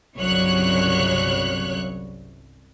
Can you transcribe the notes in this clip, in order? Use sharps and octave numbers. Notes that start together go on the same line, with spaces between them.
G1 C2 C#3 F#3 C#5 F#6